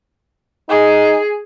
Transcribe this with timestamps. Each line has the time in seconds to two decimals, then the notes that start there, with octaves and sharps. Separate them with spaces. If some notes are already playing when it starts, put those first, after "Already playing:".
0.69 D#4 G#4